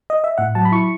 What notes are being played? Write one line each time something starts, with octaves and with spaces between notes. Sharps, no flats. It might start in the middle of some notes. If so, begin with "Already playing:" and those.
D#5
E5
A2 F#5
F#3 A5
B5
E4 C#6